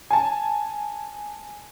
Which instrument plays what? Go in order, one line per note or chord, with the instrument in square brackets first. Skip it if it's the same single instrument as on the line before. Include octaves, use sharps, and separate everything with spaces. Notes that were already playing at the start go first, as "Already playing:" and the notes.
[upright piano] G#5 A5